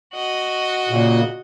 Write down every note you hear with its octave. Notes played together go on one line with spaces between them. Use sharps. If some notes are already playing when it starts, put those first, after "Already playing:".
F#4 D#5
A#2 C#3